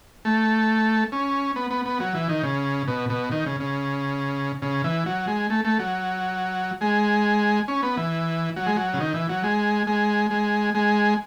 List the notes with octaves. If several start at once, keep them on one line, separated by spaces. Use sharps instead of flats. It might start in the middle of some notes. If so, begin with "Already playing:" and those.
A3
C#4
B3
B3
B3
F#3
E3
D#3
C#3
B2
B2
D#3
C#3
C#3
C#3
E3
F#3
G#3
A3
A3
F#3
G#3
C#4
B3
E3
F#3
G#3
F#3
C#3
D#3
E3
F#3
G#3
G#3
G#3
G#3